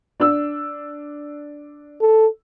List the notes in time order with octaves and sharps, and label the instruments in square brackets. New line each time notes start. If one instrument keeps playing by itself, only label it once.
[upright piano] D4 E6
[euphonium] A4